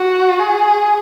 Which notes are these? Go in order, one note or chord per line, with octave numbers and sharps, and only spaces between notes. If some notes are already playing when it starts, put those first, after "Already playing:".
Already playing: F#4
G#4